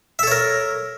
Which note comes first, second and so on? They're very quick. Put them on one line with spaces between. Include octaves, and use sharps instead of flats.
E5 A4 C#5 A#4